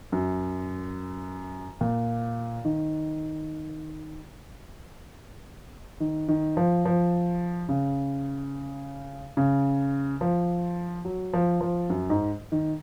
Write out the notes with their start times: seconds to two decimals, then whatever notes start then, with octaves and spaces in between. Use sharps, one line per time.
0.12 F#2
1.81 A#2
2.65 D#3
6.00 D#3
6.28 D#3
6.57 F3
6.85 F3
7.69 C#3
9.37 C#3
10.21 F3
11.05 F#3
11.33 F3
11.61 F3
11.90 F#2
12.10 G#2
12.52 D#3